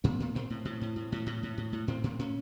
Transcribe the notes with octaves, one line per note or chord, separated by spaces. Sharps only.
A2 B3
A2
A2 C4
A2
A2
A2
A2
A2
A2
A2
A2
A2
A2 C4
A2
A2 C#4